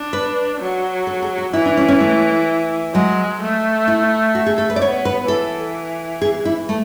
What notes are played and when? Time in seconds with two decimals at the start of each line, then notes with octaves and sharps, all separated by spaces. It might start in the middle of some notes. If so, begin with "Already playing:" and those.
Already playing: D4
0.13 B4
0.60 F#3
1.07 A4
1.22 G#4
1.38 F#4
1.53 E3 E4
1.65 D4
1.77 C#4
1.88 C#4
2.00 A3
2.94 F#3 G#3
3.41 A3
3.88 E4
4.35 F#4
4.46 G#4
4.58 A4
4.70 B4
4.76 D5
4.81 B3 C#5
5.05 B4
5.28 E3 A4
6.22 G#4
6.45 E4
6.69 A3